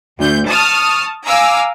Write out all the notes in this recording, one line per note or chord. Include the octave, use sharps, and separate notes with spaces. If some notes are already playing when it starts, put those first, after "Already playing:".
D2 G6
A5 C#6 D#6 F6
F5 G#5 A#5 D6 E6